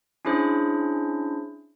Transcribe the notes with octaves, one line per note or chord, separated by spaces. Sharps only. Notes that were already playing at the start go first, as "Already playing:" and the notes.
C#4 D4 E4 G#4 C5